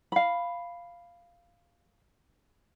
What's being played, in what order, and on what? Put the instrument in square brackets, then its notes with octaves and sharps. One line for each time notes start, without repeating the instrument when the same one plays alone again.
[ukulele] F5 B5